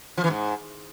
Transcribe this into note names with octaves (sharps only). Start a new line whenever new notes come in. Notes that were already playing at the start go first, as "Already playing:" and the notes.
F3
E3
G#2